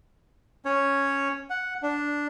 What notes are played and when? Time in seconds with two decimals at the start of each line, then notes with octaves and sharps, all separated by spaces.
0.65 C#4 C#5
1.50 F#5
1.83 D4